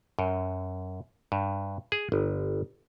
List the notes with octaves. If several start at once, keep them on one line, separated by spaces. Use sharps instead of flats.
F#2
G2
G#4
G1